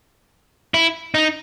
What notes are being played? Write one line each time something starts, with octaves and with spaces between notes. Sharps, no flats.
E4
D#4